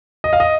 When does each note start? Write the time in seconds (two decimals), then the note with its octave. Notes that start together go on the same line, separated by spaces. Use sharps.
0.24 D#5
0.33 F5
0.40 D#5